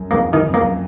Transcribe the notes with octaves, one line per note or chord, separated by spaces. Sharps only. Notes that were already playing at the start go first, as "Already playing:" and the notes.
Already playing: F#2
F2 G#2 A#3
F#2 D#3
F2
A#3
F#2